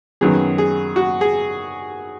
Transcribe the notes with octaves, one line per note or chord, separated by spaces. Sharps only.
F#2 D#3 F#3 B3 G#4
G#4
F#4
G#4